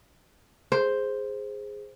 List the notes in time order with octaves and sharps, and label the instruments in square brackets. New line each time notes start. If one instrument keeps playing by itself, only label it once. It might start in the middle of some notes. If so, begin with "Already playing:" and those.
[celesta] G#4 [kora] C5